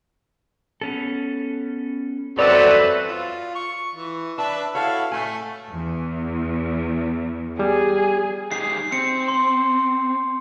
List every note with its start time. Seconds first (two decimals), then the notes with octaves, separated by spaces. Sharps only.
0.81 B3 C#4 A4
2.39 C4 F#4 A4 B4 C#5 D5 E5
3.07 F4
3.55 C#6
3.95 E3
4.38 D4 B4 E5 A5
4.75 E4 F#4 A4 C#5 F5
5.11 A2 A3 G#5
5.70 E2
7.59 G3 G#4
8.52 D#4 G4 G#4 C7
8.92 C4 C#7
9.28 C6